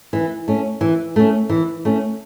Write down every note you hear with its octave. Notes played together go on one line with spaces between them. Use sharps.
E3
A3 C#4
E3
A3 C#4
E3
A3 C#4